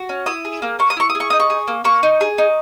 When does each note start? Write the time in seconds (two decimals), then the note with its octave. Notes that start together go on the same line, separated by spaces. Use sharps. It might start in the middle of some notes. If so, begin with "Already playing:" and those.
Already playing: F#4
0.09 C#4
0.26 E4 D#6
0.45 G#4
0.62 A#3
0.79 A#3 C#6
0.90 D#6
0.97 E4 C#6
1.10 D#6
1.15 G#4
1.20 C#6
1.30 D#4 D#6
1.40 C#6
1.50 G#4
1.68 A#3
1.84 A#3 C#6
2.03 D#4
2.21 G#4
2.38 D#4